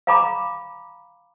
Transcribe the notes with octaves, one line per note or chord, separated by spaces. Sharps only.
F5 G#5 A#5 B5 D6